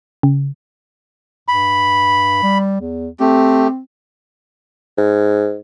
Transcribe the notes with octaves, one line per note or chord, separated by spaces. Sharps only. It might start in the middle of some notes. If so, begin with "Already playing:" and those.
C#3
G2 B5
G3
E2
A3 C4 G4
G#2